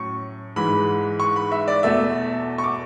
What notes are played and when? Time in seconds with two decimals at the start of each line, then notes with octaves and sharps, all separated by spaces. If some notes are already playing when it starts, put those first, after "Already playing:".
Already playing: A2 F#3 C#4 C#6
0.56 G#2 E3 G#3 B5
1.20 C#6
1.36 B5
1.52 E5
1.68 D5
1.83 E2 B2 A3 E5
2.58 C#6
2.64 D6